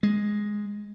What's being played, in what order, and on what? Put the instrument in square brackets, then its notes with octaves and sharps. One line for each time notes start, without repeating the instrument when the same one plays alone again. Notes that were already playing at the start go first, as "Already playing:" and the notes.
[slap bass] G#3